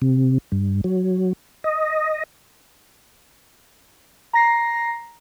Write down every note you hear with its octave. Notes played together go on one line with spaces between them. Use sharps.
C3
G2
F#3
D#5
A#5 A#6 C7